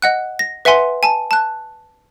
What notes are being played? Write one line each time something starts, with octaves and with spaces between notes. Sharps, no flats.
D#5 F#5 F#6
A#6
B4 E5 F#5 G#5 C6
G#5 A5
A5 F#6